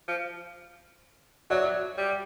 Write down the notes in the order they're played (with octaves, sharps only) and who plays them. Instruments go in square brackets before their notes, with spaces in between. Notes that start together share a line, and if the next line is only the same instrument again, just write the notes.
[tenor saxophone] F3
[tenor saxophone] F#3 [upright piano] D5 E5
[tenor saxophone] G3